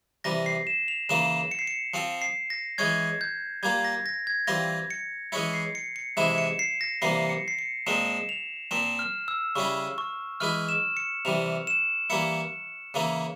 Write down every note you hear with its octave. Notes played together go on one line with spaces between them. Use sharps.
C3 E3 G3 A#6
C7
E7
F7
C#3 E3 A#3 F4 E7
C#7
C7
C#7
F3 C4 F4
C7
A#6
E3 G#3 C#4 G#6
G6
G3 A#3 F4 G#6
A#6
A#6
G#6
E3 G3 C4 F4 A#6
C#7
E3 G#3 C#4 E4 C#7
C7
C#7
C#7
C3 E3 G#3 E4 E7
C#7
C7
A#6
C3 E3 G3 A#3 C7
C#7
C7
C#7
A#2 F3 G#3 C4 E7
F7
A#2 F3 C4 E7
F6
E6
C#3 G3 C#4 E4 C#6
C#6
E3 G#3 E4 F6
E7
C#7
C3 E3 G3 F7
E7
E3 G3 A#3 E4 C#7
C#3 E3 A#3 E4